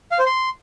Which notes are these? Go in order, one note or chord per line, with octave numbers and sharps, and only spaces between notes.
F5
C5
C6